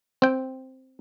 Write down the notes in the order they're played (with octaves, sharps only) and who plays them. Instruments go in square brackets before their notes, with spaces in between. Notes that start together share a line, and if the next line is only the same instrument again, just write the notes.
[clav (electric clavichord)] C4 G5